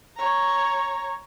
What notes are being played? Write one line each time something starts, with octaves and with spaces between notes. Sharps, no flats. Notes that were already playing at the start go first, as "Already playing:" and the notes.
C#5 A#5